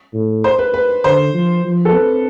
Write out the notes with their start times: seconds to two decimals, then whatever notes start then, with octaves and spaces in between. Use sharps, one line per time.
0.14 A2
0.44 C5
0.59 B4
0.74 B4
1.04 D3 C5
1.34 F3
1.64 F3
1.85 A4
1.94 C4 B4